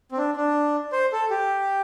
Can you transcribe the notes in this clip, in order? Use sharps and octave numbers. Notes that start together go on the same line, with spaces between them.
C4
D4
D4
C5
A4
G4